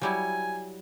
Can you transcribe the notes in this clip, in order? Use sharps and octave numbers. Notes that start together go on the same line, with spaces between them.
F#3 G3 E4 G#5